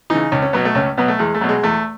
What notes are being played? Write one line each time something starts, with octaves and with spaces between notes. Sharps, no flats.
C#3 E3 D#4
C#2 C#4
C#4
B2 F#3 B3
A3
C#2 C#4
B2 F#3 B3
A3
E2 G#3
A3
B2 F#3
G#3
E2 A3